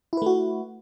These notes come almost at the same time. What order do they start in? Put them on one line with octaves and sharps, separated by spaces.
E4 B4 A3 F#4